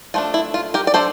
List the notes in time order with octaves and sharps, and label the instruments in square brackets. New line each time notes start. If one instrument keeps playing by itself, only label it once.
[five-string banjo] F3 A3 D4 F4
E4
F4
G4 A#4
D5
A3 D4 A4 C5